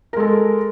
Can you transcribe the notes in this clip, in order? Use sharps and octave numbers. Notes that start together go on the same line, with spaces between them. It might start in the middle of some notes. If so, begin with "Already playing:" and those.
G#3 A4 A#4